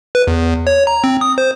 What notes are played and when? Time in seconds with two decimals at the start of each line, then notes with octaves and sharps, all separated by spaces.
0.15 B4
0.27 E2
0.67 C#5
0.87 A#5
1.04 C4
1.21 D#6
1.38 C5